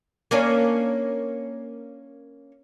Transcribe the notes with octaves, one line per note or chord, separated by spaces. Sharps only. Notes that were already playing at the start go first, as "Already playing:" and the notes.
A#3 C#4 D4